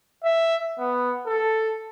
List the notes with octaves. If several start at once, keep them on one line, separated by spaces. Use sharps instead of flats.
E5
B3
A4